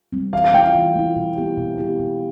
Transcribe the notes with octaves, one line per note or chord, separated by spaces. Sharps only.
G3 C4
E3 F5
F5
A3 E4 G5
F5
E3
A3 E4
B2
B3 E4 G4
B2
B3 E4 G4
B2